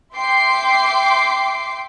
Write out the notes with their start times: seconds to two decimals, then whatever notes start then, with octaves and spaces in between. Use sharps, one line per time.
0.14 E5 G5 C6 D6 C7